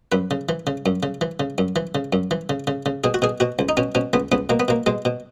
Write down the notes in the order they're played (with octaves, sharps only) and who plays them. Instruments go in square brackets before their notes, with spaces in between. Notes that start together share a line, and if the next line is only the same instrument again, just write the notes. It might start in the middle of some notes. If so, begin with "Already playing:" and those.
[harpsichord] F#2 B4
C#3
E3
C#3
F#2
C#3
E3
C#3
F#2
E3
C#3
F#2
E3
C#3
C#3
C#3
B2 G#4
F#4
B2 G#4
B2 F#4
C#2
D#4
B2 C#4
B2 C#4
C#2 B3
C#2 B3
B2 A#3
B3
B2 A#3
B2 G#3
B2